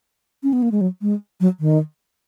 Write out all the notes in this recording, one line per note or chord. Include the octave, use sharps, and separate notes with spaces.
C#4
B3
A#3
G#3
F#3
G#3
F#3
D#3